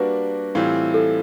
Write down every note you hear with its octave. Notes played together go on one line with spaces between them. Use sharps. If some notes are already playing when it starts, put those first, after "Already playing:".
Already playing: G3 A#3 D4 F#4 B4
A2 E3 G3 C4 F4
A4